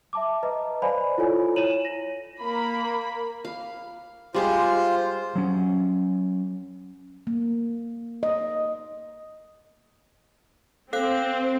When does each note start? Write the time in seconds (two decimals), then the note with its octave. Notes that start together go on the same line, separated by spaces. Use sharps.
0.13 E5 A5 D6
0.43 B4 D#5 A#5
0.82 C5 D5 F5 G#5 B5
1.18 E4 F4 A4 C#5 G#5
1.56 E4 C#5 D#7 E7 F#7
1.85 A#6
2.40 A#3 B5
3.45 F5
4.34 G3 G#3 F4 G4 C5
5.35 F#3 C#4
7.27 A#3
8.23 D#5
10.93 C4 A4 F5 F#6